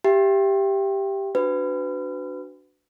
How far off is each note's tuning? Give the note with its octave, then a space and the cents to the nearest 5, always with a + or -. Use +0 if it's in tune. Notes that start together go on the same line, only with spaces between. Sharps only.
G4 +0 E5 +40 G5 +0
D4 +0 F#4 +0 B4 +25